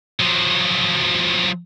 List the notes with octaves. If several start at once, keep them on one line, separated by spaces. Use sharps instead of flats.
F3 F#3